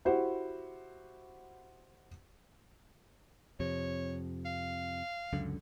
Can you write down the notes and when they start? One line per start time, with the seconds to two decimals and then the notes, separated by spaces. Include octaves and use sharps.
0.05 E4 F#4 G4 C5 F#5
3.60 F2 C3 C#5
4.46 F5
5.33 C#2 F#2 D3